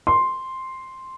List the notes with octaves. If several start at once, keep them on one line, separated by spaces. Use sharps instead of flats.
C6